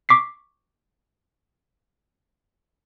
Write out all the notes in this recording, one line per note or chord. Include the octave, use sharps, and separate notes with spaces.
C#6 D6 B6 C7